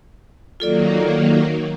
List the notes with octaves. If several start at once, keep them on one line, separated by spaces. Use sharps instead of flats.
D#3 F#3 A#3 F4 A4 D5